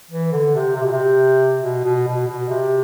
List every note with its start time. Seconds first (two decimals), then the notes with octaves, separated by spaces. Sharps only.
0.11 E3
0.32 D3
0.55 C3
0.76 C3
0.83 B2
0.92 C3
1.63 B2
1.84 B2
2.07 B2
2.28 B2
2.49 C3